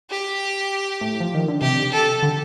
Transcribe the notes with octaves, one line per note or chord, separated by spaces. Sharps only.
G4
A2
F3
D#3
D3
C3 G4
A4
D3